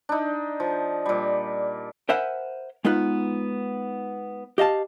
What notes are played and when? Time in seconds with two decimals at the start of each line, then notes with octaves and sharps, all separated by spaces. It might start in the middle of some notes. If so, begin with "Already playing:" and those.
0.09 D4 D#4
0.60 F3
1.06 A#2 G3
2.09 A#4 C5 E5 F#5 G#5 B5
2.85 G#3 B3 D#4 F4 B4
4.58 G4 D#5 F5 A5